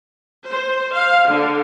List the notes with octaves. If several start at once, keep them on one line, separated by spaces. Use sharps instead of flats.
C5
F5
D3